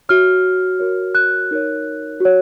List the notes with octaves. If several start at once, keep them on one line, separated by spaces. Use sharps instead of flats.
F#4 C#5 F6
F#4 A#4 C#5
F#6
D#4 A#4 C#5
F#4 C#5